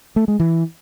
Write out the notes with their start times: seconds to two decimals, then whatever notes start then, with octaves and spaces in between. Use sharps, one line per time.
0.16 A3
0.28 G#3
0.40 E3